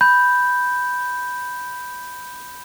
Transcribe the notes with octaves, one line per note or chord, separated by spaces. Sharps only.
B5 G6